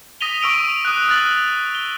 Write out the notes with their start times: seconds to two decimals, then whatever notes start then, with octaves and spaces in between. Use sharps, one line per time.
0.21 D#6 A#6 B6 D#7 F7 G7
0.41 C#6 E6 D7 D#7 G7
0.85 D#6 F#6
1.08 F6 F#6 A6 F#7
1.75 G7